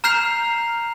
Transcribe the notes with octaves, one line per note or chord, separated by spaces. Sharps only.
A#5 F6 G6 C7 F7